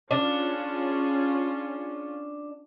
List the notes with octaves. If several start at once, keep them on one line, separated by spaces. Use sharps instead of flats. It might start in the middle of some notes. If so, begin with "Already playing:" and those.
C#4 D4 F4 G#4